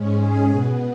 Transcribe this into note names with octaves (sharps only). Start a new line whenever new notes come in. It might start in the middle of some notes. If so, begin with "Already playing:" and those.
Already playing: G#2 G#3 C#4
G#4
B2 B3 G#4